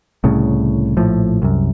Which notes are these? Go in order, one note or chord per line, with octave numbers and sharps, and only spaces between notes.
C2 A2 C#3
A#1 A2 F3
C2 F#2